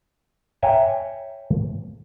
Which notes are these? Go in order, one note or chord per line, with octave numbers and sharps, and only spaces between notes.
C#5 E5 G5 G#5 A#5